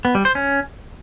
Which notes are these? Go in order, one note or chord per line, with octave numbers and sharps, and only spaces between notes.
B3
G3
C5
C#4